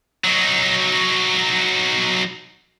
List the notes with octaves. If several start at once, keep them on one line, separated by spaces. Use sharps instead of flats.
F#3 D#4